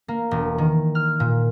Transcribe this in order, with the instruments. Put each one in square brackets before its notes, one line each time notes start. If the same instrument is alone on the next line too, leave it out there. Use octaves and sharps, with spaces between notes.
[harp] A#3
E1
D#3
F6
A#2